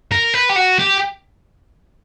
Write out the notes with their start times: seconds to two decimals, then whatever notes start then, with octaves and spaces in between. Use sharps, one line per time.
0.12 A#4
0.34 B4
0.49 G4
0.56 F#4
0.79 G4